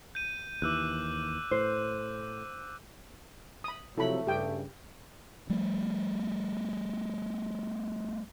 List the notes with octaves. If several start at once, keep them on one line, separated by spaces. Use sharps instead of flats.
G6 D#7
D#2 E3 D6 E6 F#6
A2 C5
B5 D#6
C3 F3 F#3 A3 E4 A4 B5
G2 C#3 G4 G5
F3 G3 A3